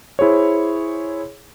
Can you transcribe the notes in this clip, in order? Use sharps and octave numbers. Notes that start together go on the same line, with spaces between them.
E4 G#4 C5 C#5